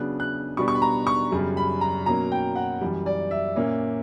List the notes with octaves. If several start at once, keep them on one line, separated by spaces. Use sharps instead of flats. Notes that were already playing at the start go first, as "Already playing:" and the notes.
Already playing: C#3 F#3 B3 D4 F#6
F#6
B2 G3 B3 D4 C#6
C#6
B5
A#5
C#6
F#2 C#3 G3
B5
A#5
B2 F#3 A#3 C#4 A#5
G5
F#5
F#2 E3 G3
D5
E5
A#2 A#3 C#4